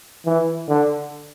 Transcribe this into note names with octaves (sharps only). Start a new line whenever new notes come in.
E3
D3